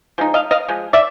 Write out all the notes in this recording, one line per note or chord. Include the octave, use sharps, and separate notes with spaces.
F3 G#3 D#4
D#5 F5
D#5 F5
F3 G#3
D5 E5